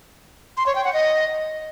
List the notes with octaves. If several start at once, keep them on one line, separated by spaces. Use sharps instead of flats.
C6
C#5
G5
F#5
D#5